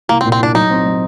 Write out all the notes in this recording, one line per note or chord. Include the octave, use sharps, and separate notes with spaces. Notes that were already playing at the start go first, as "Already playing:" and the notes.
C2 A#3
C4
A#2
C4
C2 D4
F#3 D#4
C4
F#3